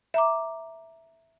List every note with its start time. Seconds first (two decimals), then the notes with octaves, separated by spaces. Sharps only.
0.14 E5 A#5 D6